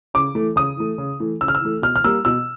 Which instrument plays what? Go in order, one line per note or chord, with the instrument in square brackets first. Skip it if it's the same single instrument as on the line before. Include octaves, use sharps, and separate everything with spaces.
[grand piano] C#3 D6
E3 A3
C#3 D#6
E3 A3
C#3
E3 A3
C#3 E6
F6
E6
E3 A3
B2 F6
F6
G3 A#3 E6
B2 E6